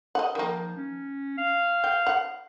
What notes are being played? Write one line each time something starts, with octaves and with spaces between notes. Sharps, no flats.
D#5 F#5
D#3 F3 A#3
C#4
F5
G5
F#5